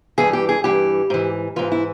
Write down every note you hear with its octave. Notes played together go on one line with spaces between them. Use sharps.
G2 E3 G#4
G4
G#4
G2 E3 G4
G#2 E3
G#2 E3 F4
E4